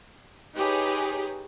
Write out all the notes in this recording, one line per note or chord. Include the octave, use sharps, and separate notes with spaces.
D#4 G4 G#4 B4 C#5